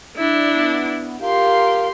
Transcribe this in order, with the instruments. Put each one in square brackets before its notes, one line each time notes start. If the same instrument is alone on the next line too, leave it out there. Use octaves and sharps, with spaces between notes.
[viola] D4 E4 [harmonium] D5
[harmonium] B3
[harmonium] F4 A#4 F5 [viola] G4 C6